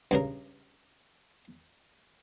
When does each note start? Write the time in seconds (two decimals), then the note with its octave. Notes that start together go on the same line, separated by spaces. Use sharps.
0.11 G2 C#3 A#4